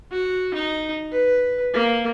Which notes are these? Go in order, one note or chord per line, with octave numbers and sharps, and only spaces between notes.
F#4
D#4
B4
A#3